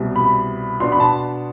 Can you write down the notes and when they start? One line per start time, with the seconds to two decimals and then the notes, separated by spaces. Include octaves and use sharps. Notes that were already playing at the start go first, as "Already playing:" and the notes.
Already playing: C2 B2 G3
0.16 B5
0.80 B2 B3 D4 C6
0.92 B5
1.00 A5